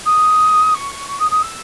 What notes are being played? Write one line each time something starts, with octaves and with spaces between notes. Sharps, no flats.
D#6
C#6
C#6
D#6
D#6
E6